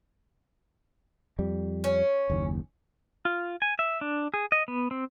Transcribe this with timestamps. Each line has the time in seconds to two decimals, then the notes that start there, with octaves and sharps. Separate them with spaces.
1.39 F2 G3
1.84 C#4
2.30 F#1 D#2
3.25 F4
3.62 G#5
3.79 E5
4.01 D4
4.34 G#4
4.52 D#5
4.68 B3
4.91 C4